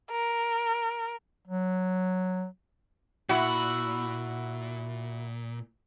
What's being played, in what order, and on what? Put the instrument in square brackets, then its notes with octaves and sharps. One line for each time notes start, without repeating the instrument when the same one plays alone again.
[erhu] A#4
[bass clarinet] F#3
[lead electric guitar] A#2 [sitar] E4 F#4